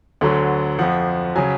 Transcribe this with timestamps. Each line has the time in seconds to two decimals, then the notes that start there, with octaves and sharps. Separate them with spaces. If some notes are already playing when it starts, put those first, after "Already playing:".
0.21 D2 D3 F#3
0.79 F2 F3 F#5
1.36 C#3 F#3 G#5